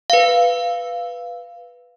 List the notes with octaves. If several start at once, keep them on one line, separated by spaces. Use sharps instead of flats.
B4 F5